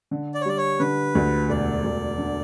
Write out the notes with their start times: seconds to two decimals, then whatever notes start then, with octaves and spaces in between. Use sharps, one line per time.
0.11 D3
0.34 D5
0.41 C#5
0.45 G3 D5
0.57 C#5
0.80 D3 B4
1.15 D2
1.49 E1 D5
1.84 D2
2.18 D3